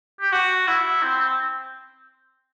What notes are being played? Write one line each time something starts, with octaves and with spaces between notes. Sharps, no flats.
G4
F#4
E4
C4
C4